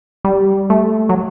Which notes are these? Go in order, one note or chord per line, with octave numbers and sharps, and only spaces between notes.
G3
A3
F#3